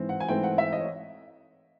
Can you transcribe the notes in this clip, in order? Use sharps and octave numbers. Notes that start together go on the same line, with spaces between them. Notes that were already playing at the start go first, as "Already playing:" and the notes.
Already playing: G#2 E3 C4
F#5
G#5
G#2 E3 A3 C4 G5
F#5
E5
D#5
C#5